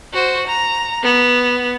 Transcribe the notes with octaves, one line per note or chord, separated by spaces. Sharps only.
F#4 C5
A#5
B3